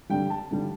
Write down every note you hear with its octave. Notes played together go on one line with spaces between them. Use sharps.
G2 D3 G3 G5
A5
G2 D3 G3